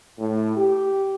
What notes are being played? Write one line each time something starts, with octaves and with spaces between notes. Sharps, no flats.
A2
G4